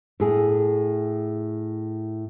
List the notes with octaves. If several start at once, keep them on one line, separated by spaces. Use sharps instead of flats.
A2 G#4